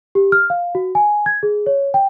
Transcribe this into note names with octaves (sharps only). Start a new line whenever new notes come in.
G4
F6
F5
F#4
G#5
G#6
G#4
C#5
G5